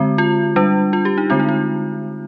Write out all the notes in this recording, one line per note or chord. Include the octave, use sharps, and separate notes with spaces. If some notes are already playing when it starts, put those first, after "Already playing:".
Already playing: D3 G#3 C4
F4
G3 D4
F4
G4
D#4
D3 G#3 C4 F4
D#4
F4